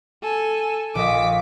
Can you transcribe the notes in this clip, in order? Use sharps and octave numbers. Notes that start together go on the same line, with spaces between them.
A4 G#5
A#1 D#5 D6 B6